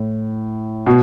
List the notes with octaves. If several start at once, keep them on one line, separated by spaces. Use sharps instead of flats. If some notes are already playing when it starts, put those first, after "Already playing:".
Already playing: A2
B2